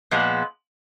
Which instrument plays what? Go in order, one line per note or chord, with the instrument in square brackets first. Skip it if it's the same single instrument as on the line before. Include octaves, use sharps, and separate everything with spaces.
[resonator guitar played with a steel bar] A#2 F3 G#3 B3